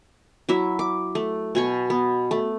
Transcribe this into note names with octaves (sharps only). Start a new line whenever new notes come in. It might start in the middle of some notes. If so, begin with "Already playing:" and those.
F#3 E4 E5
D6
A3
B2 G#5 C#6
B3
A3